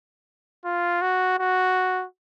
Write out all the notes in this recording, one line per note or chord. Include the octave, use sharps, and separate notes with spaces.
F4
F#4
F#4